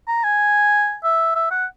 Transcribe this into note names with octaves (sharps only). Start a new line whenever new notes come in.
A#5
G#5
E5
E5
F#5